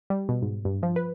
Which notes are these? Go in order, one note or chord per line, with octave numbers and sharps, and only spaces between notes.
G3
B2
G#2
G2
F3
B4